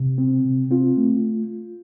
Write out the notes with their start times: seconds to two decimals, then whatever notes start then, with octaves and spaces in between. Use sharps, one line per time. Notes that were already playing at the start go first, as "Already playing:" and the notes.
Already playing: C3
0.18 C4
0.45 C3
0.71 C4 F4
0.97 A3